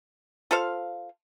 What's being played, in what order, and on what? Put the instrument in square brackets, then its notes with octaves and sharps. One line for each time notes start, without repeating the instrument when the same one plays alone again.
[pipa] F4 A4 C5 F5